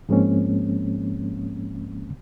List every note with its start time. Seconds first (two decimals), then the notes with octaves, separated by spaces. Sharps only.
0.09 G#2 F3 G#3 A#3 C4 C#4